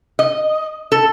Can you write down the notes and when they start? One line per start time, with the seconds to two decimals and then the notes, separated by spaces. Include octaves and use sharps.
0.19 D#5
0.92 A4